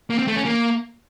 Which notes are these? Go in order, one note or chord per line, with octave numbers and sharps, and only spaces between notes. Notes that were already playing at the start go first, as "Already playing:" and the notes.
A#3
C4
A3
C#4
A#3